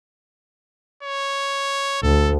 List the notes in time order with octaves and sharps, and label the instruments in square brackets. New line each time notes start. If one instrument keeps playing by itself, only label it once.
[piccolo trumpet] C#5
[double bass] D2 [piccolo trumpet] A4